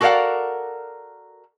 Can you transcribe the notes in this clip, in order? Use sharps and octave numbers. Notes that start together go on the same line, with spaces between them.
F#4 A4 A#4 D5 F5 F#5